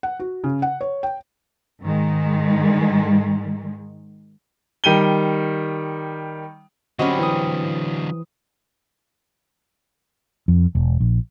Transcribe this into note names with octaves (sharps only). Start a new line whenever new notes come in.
F#5
F#4
C#3
F#5
C#5
G5
G#2 D#3 G#3
D#3 G3 D#7 G7
D3 F#3 G3 C4 C#4 F#4 D#5
E3 D#6
F2
E1
A#1